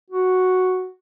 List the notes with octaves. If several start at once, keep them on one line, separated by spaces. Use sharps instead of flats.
F#4